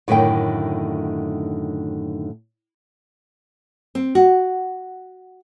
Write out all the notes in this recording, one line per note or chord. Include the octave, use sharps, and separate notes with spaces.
F#2 A2 D3 D#3 G5
C4
F#4